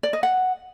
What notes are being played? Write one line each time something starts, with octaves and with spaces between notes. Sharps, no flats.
D5
D#5
F#5